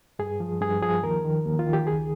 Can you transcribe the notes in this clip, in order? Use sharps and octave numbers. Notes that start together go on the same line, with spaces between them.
G2 G#4
F3
G2 G#4
F3 G#4
D#2 A#4
D#3
D#2
F4
D#3
G4
C#2 G#4